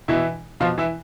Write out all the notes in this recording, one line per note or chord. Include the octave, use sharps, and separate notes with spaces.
B2 E3 E4
B2 F3 F4
E3 E4